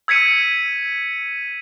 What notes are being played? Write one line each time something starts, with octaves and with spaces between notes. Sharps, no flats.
E6 G#6 B6 C#7 D#7